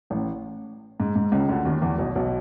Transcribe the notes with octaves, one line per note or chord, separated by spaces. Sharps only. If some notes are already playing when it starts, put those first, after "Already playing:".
A1 A2
G#2
G#2
C#2 C#3
D2 D3
D#2 D#3
E2 E3
B1 B2
B1 B2